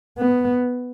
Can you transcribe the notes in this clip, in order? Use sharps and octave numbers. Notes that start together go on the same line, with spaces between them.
B3